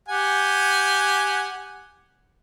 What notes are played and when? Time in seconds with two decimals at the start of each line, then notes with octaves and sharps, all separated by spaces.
0.08 G4 F#5 G#5